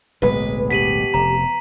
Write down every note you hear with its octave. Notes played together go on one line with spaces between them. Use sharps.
D1 B1 G#3 B4
B2 G4 B6 D#7 F#7
F1 A#5